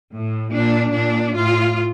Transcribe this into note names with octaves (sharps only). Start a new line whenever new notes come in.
A2
A#2 D4
A#2 D4
A2 F4